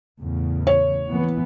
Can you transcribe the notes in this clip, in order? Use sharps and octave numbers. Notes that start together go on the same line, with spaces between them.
E2 A2 C#3
C#5
E3 B3